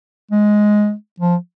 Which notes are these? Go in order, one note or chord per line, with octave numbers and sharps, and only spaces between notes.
G#3
F3